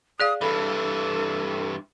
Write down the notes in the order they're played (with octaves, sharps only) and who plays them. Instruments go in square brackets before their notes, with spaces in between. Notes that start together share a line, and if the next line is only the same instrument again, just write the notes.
[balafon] G#4 D5 F5 [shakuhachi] D#6
[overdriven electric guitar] G2 E3 [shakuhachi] A4 [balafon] B5